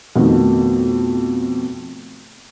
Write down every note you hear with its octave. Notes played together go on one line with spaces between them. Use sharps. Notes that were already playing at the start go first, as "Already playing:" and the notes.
F2 B2 D#3 A3